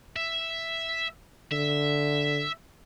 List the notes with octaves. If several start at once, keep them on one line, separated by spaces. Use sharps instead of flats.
E5
D3 E5